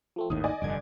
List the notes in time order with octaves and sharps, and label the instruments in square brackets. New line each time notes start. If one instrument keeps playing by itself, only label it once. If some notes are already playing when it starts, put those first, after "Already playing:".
[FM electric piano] F3 A3 C4
[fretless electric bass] G#1 D#2 A2 [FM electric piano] D#3 [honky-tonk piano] D#6
[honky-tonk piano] D5 D#5 G#5
[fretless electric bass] F1 G2 D3 [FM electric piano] D6 G#6